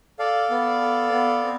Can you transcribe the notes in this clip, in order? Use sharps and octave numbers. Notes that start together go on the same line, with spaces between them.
A4 D5 F5
B3
A4
B3
C4